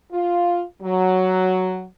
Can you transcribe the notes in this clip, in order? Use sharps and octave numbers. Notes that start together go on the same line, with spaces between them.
F4
F#3